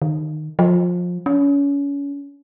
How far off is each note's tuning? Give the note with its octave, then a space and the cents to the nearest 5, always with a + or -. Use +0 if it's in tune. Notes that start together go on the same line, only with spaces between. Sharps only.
D#3 -20
F3 +25
C#4 +30